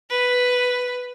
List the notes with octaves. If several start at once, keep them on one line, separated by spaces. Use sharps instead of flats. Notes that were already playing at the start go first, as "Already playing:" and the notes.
B4